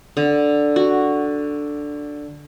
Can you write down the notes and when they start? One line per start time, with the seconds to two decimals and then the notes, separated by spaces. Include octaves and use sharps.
0.17 D3
0.76 F#4